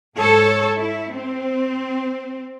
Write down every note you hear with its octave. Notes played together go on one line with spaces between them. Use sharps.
G#2 A4 C#5
E4
C4